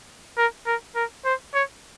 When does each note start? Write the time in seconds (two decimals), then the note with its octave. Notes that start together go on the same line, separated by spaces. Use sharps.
0.37 A#4
0.66 A#4
0.95 A#4
1.25 C5
1.54 C#5